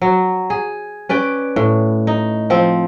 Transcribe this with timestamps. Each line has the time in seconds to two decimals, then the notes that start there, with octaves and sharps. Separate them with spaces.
0.02 F#3
0.50 G#4
1.09 C#4 B4 D5 G5
1.56 A2
2.07 D#4
2.50 F3 C4